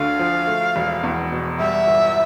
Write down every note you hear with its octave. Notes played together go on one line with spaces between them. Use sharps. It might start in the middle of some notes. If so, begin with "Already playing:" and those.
Already playing: D2 D3 F5
F3
A3
E1
E2
B2
G3 E5
G1